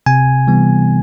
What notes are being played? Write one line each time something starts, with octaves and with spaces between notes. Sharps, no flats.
C3 G#5
E3 G3 B3